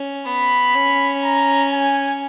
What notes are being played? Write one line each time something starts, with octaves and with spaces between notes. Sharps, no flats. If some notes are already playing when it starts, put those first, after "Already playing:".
Already playing: C#4
B3 B5
C#4
A#5
G#5